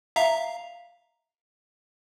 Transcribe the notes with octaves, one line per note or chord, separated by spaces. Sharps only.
E5 F5 A#5